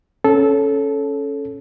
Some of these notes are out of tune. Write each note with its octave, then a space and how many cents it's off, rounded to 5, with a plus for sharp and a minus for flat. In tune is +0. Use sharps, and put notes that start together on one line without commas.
C#4 +0 A4 -15